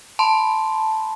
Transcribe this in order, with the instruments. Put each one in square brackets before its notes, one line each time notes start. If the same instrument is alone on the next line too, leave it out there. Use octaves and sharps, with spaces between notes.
[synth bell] A5 B5 C6